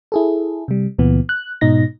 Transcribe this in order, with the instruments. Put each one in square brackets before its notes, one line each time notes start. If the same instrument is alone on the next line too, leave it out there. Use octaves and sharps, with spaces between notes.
[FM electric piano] E4 G#4 A4
C3 G3
C#2 A#2 E3 B3
F#6
G#2 B2 D#4 A#6